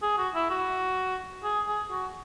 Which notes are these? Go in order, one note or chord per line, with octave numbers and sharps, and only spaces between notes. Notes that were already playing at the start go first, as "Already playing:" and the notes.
G#4
F#4
E4
F#4
G#4
G#4
F#4